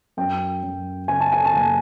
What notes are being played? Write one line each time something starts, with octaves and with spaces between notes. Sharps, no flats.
F#2 G5
F#2
C#3 G#5
A5
G#5
A5
F#1 G#5